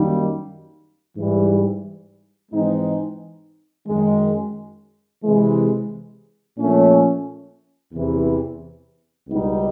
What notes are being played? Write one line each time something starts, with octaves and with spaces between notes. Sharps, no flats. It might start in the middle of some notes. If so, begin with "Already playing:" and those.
Already playing: F#2 D#3 G3 A#3 D#4
G#2 E3 G3
G#2 E3 G#3 C4 D#4
F#2 D#3 G#3
C3 E3 G#3
A#2 F3 A3 C#4
E2 C3 E3
C#2 B2 G3 B3 D#4